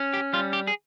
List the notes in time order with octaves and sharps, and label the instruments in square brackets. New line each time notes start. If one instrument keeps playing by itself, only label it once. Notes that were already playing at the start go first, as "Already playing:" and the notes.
Already playing: [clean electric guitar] C#4
G4
G3 F4
G4
G#4